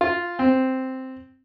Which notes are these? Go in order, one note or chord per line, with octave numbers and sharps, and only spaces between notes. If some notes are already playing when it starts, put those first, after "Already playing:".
F4
C4